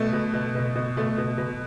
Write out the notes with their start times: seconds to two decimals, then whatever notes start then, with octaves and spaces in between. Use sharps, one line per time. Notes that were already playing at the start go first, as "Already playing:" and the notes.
Already playing: B2 A3
0.13 B2
0.33 B2
0.55 B2
0.76 B2
0.97 B2 A3
1.18 B2
1.38 B2